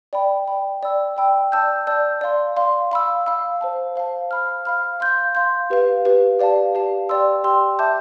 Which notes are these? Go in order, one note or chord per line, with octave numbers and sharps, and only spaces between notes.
D5 G5 B5
D5 G5 B5
D5 G5 B5 E6
D5 G5 B5 E6
D5 A5 E6 G6
D5 A5 E6 G6
D5 F5 C6
D5 F5 C6
F5 B5 E6
F5 B5 E6
C5 F5 A5
C5 F5 A5
F5 B5 F6
F5 B5 F6
F5 C6 G6
F5 C6 G6
G4 B4 F5
G4 B4 F5
G4 D5 F5 A5
G4 D5 F5 A5
G4 D5 G5 C6 E6
G4 D5 G5 C6 E6
E5 A5 D6 G6